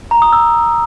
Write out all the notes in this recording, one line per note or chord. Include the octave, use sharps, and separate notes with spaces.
A#5
D#6
E6